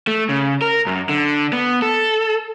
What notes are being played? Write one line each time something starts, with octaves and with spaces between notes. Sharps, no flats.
A3
C#3
A#4
F#2
D3
B3
A4